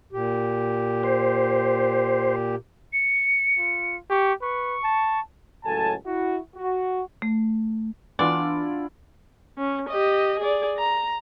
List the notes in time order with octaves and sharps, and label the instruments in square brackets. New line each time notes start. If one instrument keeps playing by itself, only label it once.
[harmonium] A#2 G4
[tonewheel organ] C5
[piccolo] C#7
[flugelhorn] F4
[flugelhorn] G4 [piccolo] C#6
[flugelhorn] B4 [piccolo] C#6
[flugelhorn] A5
[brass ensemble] C#2 A2 F#3 A4 G#5 A5
E4 F#4
F#4
[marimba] A3
[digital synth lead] E3 [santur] B3 E4 F4 [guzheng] D4 [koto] D5
[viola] C#4
G4 D#5
G#4 D5
A#5